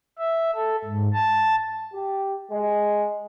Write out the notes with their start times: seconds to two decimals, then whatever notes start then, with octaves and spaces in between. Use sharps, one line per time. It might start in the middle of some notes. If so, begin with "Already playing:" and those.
0.19 E5
0.55 A4
0.84 G#2
1.13 A5
1.93 G4
2.51 G#3